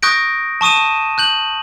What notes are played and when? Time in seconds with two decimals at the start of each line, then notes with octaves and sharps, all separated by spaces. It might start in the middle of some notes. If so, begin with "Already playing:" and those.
0.03 C#6 D#6 F#6 G6 A#6 D7
0.61 A5 C#6 D#6 D#7 E7
1.18 F#6 G6 F#7